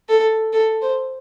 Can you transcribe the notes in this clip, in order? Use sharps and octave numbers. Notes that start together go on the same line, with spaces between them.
A4
A4
C5